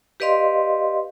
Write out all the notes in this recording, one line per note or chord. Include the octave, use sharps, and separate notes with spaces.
G4 B4 D5 D#5 F5 C6